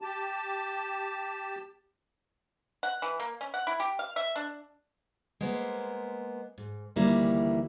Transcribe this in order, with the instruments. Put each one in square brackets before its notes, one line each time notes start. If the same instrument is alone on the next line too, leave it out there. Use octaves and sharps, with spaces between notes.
[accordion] G4 A5
[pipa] F#5
E3
A#3
C#4
F#5
E4
G4
F5
E5
D4
[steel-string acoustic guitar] G#3 A#3 B3 C5
G#2
D2 D#3 E3 G3 A#3 E4